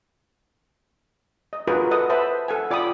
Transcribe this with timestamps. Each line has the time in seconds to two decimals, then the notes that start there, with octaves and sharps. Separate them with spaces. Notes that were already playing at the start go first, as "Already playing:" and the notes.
1.53 D#5
1.67 F4 F#4 G#4 A#4 B4 D#5
1.91 A4 B4 D#5 F#5 D#6
2.10 B4 C5 E5 A5 B5
2.48 A4 F#5 G#5
2.71 F4 D5 G5 B5 D#6